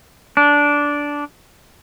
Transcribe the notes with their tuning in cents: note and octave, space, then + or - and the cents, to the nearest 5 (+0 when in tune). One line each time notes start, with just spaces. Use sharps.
D4 -10